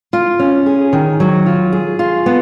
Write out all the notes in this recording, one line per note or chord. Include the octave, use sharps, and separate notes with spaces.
F4
C#4
G#4
D#3
F#3
F4
G#4
F4
B3